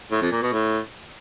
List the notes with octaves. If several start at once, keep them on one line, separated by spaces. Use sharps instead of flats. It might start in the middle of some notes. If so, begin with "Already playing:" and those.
A2
F2
A#2
B2
A2